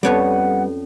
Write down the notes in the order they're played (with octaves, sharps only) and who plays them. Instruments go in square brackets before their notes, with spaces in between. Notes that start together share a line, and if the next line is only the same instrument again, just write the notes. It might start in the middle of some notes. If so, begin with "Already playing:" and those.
[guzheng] F2 C#5 D5 [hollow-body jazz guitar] G3 B3 [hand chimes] C#4 A4 [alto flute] F#5